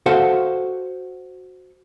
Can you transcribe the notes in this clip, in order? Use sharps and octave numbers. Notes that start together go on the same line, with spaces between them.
F#4 A4 C5 F5 F#5